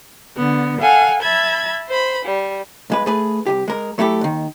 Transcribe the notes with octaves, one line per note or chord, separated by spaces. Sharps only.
D3 B3
A4 F5 F#5 G#5
E5 A5 B5 G#6
C5 B5
G3
B1 G#3 B4
A3 G#4 B4
C2 G#2 G4
G#3 A#4
F#3 A3 E4 G4 A4
D#2 D#3